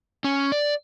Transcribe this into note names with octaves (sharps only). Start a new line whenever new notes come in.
C#4
D5